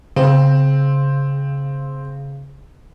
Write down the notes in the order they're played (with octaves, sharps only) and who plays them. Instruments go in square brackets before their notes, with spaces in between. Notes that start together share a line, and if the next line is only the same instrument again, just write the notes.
[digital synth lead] C#3 [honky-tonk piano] C4